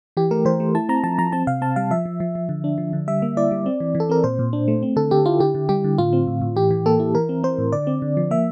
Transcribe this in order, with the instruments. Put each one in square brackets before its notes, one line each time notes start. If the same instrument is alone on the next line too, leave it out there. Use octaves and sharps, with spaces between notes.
[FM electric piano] E3 G4
A3 A#4
E3 C5
A3
E4 A5
C4 A#5
F3 A5
F3 A#5
C4 A5
C3 F5
C4 A5
G3 F5
F3 E5
F3
F3
F3
D3
D4
F3
D3
G3 E5
A#3
E4 D5
G3
C4
E3
E3
A4
C4 A#4
A#2 C5
A#2
D4
A3
C4
D3 A4
D3 G4
E4 F4
D3 G4
D3
G3 G4
D3
A2 F4
C4
A2
A2
E3 G4
E3
A#3 A4
E4
E3 A#4
C4
C4 C5
A2
D3 D5
C4
D3
F3
A#3 E5